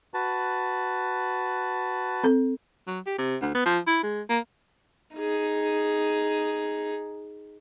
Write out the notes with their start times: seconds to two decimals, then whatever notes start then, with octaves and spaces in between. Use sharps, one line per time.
0.14 F#4 B4 A5
2.24 C4 A4
2.87 F#3
3.07 G4
3.18 C3
3.42 D2
3.55 B3
3.66 F3
3.87 E4
4.03 G#3
4.30 A#3
5.15 D#4 G#4